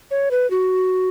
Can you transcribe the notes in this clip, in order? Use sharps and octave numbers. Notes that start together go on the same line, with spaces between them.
C#5
B4
F#4